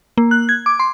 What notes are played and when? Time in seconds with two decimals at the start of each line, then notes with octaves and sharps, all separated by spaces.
0.18 A#3
0.31 F#6
0.49 G#6
0.66 D6
0.80 C6